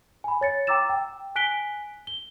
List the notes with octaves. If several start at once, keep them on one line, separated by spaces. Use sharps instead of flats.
G#5 B5
C#5 A6 C#7
G5 A#5 D6 E6 A6 E7
G5
G#5 F#6 B6 D7 G7
G7